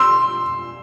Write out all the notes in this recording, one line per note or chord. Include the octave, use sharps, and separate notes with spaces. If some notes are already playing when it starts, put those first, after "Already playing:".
Already playing: C6 E6